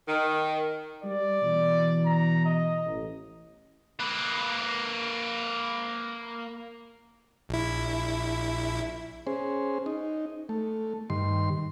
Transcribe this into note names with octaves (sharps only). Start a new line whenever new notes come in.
D#3
G3 D5
B2 E3
A#5
D#5
A1
A#3 B4
A#1 E4
C#4 G#4 C5
D#4
A3
G2 D#3 C6